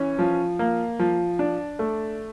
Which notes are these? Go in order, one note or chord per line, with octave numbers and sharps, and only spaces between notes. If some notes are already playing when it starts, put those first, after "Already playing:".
Already playing: E3 C#4
F3
A#3
F3
D4
A3